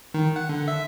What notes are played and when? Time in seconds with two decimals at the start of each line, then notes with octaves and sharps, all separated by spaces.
0.14 D#3
0.36 F#5
0.49 D3
0.68 E5